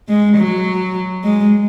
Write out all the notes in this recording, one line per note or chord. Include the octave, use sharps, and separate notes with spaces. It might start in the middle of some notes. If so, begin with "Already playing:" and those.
G#3
F#3
G#3